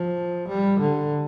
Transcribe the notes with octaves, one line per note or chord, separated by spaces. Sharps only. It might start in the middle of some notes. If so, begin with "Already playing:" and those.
Already playing: F3
G3
D3